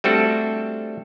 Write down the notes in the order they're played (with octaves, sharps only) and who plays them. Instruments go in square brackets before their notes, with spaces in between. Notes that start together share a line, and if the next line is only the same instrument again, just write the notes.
[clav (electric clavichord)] G3 A3 C4 D4 F#4 A4